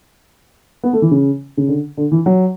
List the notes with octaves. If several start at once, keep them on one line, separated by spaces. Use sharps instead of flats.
B3
A3
E3
C#3
C#3
D3
D3
E3
F#3